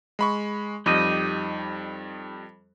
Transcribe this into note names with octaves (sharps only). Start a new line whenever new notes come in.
G#3 B5 C#6
F2 G3 D#4 G4 D#5